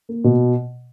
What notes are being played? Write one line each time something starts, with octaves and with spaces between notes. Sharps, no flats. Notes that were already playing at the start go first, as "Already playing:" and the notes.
A#3
B2